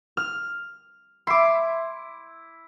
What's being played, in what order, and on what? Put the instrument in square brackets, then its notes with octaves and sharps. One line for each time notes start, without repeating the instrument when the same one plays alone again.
[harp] F6
[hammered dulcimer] E4 [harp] C6 D6